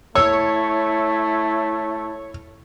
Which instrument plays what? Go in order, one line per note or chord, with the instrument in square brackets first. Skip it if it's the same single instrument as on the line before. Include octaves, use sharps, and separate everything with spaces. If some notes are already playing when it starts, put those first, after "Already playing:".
[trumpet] A3 [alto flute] E4 [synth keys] C#5 [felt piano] E6